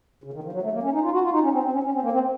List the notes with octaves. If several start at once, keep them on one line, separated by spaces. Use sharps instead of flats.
C#3
D#3
F3
F#3
A3
A#3
C#4
D#4
F4
F#4
F4
D#4
C#4
C4
C4
C#4
C#4
C4
A#3
C4